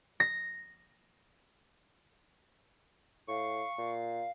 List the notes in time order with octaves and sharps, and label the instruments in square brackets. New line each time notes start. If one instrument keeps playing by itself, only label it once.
[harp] A#6
[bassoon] A2 [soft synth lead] F5 [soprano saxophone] C#6
[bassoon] A#2 [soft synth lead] F5